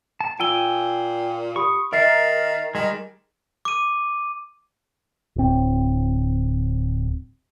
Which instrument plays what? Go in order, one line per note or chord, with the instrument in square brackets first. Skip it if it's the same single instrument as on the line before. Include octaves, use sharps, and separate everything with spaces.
[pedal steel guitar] A5
[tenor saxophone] A#2 [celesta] F4 G7 [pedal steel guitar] G5 G#5 E6
[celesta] G4 B5 D#6 [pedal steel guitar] C#6
[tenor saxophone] D#3 [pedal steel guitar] A#4 [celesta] E5 A6 C7
[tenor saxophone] D#3 [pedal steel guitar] G3 G#3
[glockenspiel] D6 D#7
[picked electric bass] D1 C4